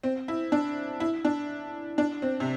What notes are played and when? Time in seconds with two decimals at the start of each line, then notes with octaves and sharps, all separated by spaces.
0.03 C4
0.28 E4
0.52 D4
1.00 E4
1.25 D4
1.98 D4
2.22 C4
2.40 C3